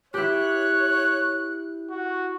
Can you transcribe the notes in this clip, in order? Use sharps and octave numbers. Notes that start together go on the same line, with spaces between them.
E4 G4 C#5 F#6
F#4